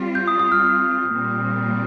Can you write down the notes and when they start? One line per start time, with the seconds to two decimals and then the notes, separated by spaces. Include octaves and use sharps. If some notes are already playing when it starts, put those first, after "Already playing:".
Already playing: G3 C4 F4
0.15 G6
0.28 D#6
0.39 D#6
0.52 F6
0.63 F6
1.10 A#2 G3 C4